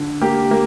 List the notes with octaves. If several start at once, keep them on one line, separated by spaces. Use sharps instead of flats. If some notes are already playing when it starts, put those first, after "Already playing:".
Already playing: D3
A#3 G4
A#3